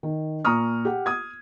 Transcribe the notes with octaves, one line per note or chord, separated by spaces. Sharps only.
D#3
A#2 A#5 C#6 D#6 F6
G4 F#5
D#6 G#6